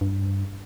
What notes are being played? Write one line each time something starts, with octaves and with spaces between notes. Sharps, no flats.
G2